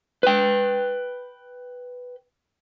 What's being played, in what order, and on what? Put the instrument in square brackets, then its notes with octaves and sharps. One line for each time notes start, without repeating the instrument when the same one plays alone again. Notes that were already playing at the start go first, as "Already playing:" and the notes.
[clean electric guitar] B4 G5